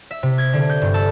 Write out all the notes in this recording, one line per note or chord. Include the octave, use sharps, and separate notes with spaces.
E5
C3
G#6
D3
G6
G2
A4